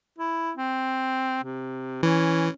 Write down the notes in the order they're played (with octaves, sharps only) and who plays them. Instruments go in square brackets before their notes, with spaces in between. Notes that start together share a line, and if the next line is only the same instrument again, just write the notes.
[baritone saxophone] E4
C4
C3
[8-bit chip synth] E3 [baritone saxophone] C#4